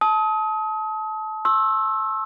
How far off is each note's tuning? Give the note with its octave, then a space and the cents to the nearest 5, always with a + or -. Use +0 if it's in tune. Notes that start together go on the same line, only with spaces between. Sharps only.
A5 -20 D#6 +35
C6 +45 E6 +0